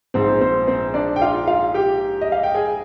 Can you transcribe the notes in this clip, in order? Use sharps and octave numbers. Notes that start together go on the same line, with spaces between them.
A#1 G#2 F3 C4 C5
C4 C5
C4 C5
D4 D5
G5
F4 F5
F4 F5
G4 G5
D#5
F5
G5
G#4 G#5